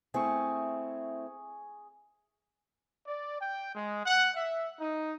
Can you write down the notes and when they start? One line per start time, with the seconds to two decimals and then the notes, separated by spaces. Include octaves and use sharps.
0.14 A3 C4 E4 G#4 C#6
3.06 D5
3.40 G5
3.74 G#3
4.04 F#5
4.35 E5
4.79 D#4